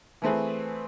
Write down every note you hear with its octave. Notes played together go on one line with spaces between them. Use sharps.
E3 A3 C4 G#4 B4